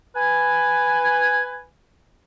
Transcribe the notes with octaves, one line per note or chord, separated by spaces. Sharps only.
B4 G#5